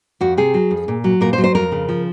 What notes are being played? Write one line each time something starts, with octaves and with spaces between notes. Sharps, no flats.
F2 F#4
C3 G#4
F#3
F2
A#2
F#3
A#2 A#4
C5
F#3
C5
F2 A#4
C#3
F3